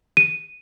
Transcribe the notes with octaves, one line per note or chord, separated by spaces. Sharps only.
D#7